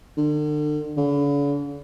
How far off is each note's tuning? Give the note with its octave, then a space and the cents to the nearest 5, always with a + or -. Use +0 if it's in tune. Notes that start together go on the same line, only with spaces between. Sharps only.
D3 +40
D3 -45